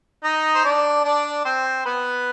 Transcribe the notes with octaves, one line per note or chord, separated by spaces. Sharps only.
D#4 D#5
C5
D4 D5
D4 D5
C4 C5
B3 B4